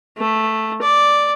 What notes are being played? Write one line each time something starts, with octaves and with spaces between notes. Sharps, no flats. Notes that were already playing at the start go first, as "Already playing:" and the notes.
A3
D5